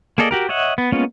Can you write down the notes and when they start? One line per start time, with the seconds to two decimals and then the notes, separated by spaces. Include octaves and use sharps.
0.18 A#3 G#4 A4 D5 D#5
0.31 F#4 G4 A#4
0.49 C#5 D#5 E5 F#5
0.78 B3
0.92 G#3 A#3 B3 C#4 F4